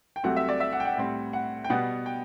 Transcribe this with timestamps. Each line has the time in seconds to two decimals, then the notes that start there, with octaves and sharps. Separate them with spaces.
0.16 G5
0.23 C2 C3 F#3 A3 C4 F#5
0.36 E5
0.49 D5
0.60 E5
0.73 F#5
0.80 G5
0.85 F#5
0.97 A2 G3 C4
1.33 F#5
1.64 G5
1.70 B2 G3 B3 F#5
2.06 G5